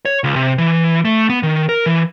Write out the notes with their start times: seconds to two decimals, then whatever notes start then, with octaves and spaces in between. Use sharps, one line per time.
0.05 C#5
0.24 C#2
0.36 C3
0.58 E3
1.05 A3
1.29 B3
1.43 D#3
1.69 A#4
1.86 E3